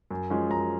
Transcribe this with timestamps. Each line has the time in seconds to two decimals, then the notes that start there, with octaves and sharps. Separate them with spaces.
0.11 F#2
0.30 F3 G#3 C#4
0.50 F#2 A#5